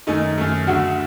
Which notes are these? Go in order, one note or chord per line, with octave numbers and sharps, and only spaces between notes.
F#2 D#3 A3 D#4 D#5
F#2 D#3 A3
D2 D3 A3 F#4 F#5